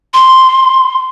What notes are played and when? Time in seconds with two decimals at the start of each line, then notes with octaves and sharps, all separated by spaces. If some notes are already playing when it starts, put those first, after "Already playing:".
0.14 C6